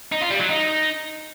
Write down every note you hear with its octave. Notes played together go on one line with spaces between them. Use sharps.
D#4
F4
G3
F#3
D#4